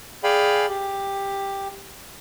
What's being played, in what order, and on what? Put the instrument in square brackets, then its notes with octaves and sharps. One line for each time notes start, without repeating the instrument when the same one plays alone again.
[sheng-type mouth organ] G#4 D5 F5 G5 G#5 B5
G4